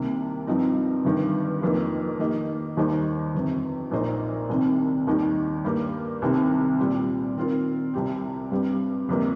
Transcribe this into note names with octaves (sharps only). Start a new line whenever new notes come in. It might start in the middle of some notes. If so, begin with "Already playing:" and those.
Already playing: C2 C3 D#3 A#3
G2 F3 C4 D#4
G1 G2 D#3
F1 F2 F3 A#3 D#4
D#3 A#3 G4 D#5
D#2 D#3 G3 D#4 C5
G1 F2 C3
A#1 A#2 A#3 D#4 C5
C2 C3 D#3 C4
D#2 D#3 G3 D#4 G4
G2 G3 A#3
C2 C3 D#3 C4 G4
A#2 G3 C4 F4
D#3 C4 F4 A#4
C2 C3 G3 C4 G4
G2 G3 C4
G1 F2 C3 G3 A#3